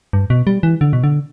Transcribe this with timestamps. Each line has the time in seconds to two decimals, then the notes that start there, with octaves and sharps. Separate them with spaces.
0.13 G2
0.30 B2
0.47 G3
0.63 E3
0.81 D3
0.93 B2
1.04 D3